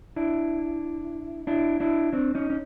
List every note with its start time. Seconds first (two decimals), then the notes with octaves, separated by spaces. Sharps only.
0.16 D4 E4
1.47 D4 E4
1.80 D4 E4
2.13 C4 D4
2.35 C#4 D#4
2.50 C#4